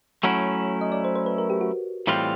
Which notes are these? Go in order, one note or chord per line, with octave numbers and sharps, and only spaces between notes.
F#3 A3 C#4 E4 F#5
D#5
D5
C5
C5
B4
A#4
G4
F#4
A2 E3 G3 C4 F4